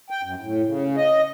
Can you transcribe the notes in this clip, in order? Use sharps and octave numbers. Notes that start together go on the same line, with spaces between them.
G5
F#2
A2
C#3
D#5